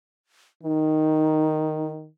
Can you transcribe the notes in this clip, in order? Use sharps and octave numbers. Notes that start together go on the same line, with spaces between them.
D#3 D#4